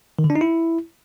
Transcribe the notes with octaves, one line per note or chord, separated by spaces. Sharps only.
D#3
D3
D4
D#4
E4